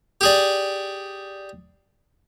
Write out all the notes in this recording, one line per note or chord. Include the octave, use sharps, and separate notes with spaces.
G4 G#4 D5